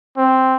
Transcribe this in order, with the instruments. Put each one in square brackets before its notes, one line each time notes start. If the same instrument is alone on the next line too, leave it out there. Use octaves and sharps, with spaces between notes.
[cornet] C4